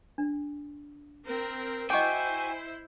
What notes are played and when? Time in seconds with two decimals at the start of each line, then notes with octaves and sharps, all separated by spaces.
0.18 D4
1.27 C4 A#4
1.90 E4 F#4 C5 D#5 G5 G#5 D6